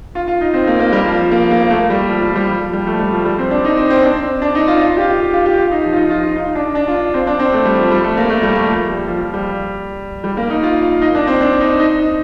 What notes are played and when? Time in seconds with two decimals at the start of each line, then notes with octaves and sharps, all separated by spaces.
0.15 F4
0.28 F4
0.41 D#4
0.54 C4
0.67 A#3
0.80 A#3
0.92 G3
1.05 F3
1.19 F3
1.31 A#3
1.51 A#3
1.70 A3
1.90 G3
2.09 F3
2.22 G3
2.30 F3
2.35 G3
2.48 F3
2.61 F3
2.73 G3
2.87 A3
2.99 G3
3.13 F3
3.25 G3
3.38 C4
3.51 D4
3.65 D#4
3.77 C4
3.90 C4
4.03 D4
4.23 C4
4.42 D4
4.55 D#4
4.68 F4
4.81 F4
4.97 G4
5.00 F4
5.20 G4
5.33 F4
5.46 G4
5.59 F4
5.71 D#4
5.84 F3
5.93 F4
5.97 D#4
6.10 F4
6.23 F4
6.36 D#4
6.55 D4
6.75 D4
6.88 F4
7.14 C4
7.27 D4
7.39 C4
7.53 A3
7.65 G3
7.78 F3
7.91 G3
8.04 A3
8.17 A#3
8.30 A3
8.43 G3
8.56 A3
8.69 F3
8.88 G3
9.08 F3
9.21 F3
9.34 G3
10.24 G3
10.37 A#3
10.50 D#4
10.63 F4
10.82 F4
11.01 D#4
11.15 D4
11.27 C4
11.41 D4
11.60 D#4
11.79 D#4
11.99 D#4